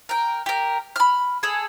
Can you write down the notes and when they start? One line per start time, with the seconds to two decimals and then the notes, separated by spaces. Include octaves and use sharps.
0.09 A#4 G5
0.46 G4 A#4
0.96 B5 F6
1.43 G#4 A4